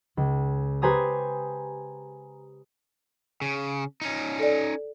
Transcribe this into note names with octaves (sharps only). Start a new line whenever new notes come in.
C#2
G4 B4 C5 G#5 A#5 D#6
C#3
C#4 D#4
A4 D5